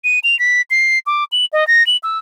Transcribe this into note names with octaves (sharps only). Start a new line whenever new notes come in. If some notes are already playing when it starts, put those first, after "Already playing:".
D#7
F7
B6
C7
D6
F#7
D#5
A#6
F#7
E6